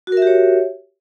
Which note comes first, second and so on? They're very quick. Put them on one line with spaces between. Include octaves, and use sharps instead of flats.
F#4 A#4 E5 G4 C#5